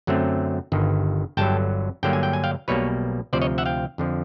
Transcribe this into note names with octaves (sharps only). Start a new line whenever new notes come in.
F#2 D3 F#3 A3 C4
G1 G2 D#3
G1 G2 D3 F#3 G5 A5
G2 D3 F#3 A#3 G5
G#5
G5
G#5
F5 G5
B1 B2 G3 A#3 B4 C#5
D2 C3 F3 C5 D5
C#5 D#5
E5 F#5
F5 G5
F2 D3 F3